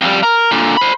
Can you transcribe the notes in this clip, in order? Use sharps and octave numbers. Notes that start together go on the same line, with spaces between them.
F2 G3
A#4
A#2 D3
C5 B5